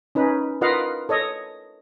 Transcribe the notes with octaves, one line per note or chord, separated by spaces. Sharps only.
C#4 D#4 B4
F4 A#4 B4 D#5 F5 F#5
A4 C#5 D#5